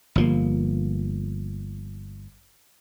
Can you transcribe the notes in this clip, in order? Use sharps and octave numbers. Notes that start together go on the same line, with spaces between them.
G1 F3 A#3